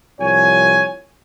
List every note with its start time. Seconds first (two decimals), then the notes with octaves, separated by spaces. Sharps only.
0.20 C2 F3 C#5 G#5